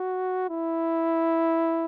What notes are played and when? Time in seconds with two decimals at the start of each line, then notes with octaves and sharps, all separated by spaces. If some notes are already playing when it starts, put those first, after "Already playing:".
Already playing: F#4
0.49 E4